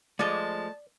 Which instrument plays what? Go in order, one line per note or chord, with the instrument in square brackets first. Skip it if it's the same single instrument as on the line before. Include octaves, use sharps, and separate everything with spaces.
[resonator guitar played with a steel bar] F3 G#3 [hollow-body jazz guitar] A3 D#5 [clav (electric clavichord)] D5 [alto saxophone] A5